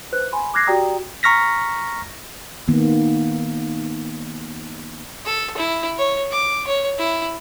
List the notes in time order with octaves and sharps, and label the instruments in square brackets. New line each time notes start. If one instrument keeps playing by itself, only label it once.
[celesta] B4 C5 F#6
G#5 B5 C6
D6 F6 F#6 G#6 A#6 C7
F#4 G4 D5 G5 A#5 D#6
[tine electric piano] A#5 C#6 F6 A#6 B6
[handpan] D#3 A#3 B3
[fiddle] A4
E4
C#5
D6
C#5
E4